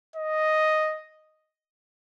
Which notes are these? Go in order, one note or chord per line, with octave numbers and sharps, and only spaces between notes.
D#5